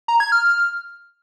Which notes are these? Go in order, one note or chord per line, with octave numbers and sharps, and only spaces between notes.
A#5
G#6
F6